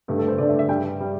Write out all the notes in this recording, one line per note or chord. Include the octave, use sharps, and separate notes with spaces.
G2 D3 A3 G4
A4
C5
G2 D3 A3 D5
E5
E5
G2 G3 G5
G3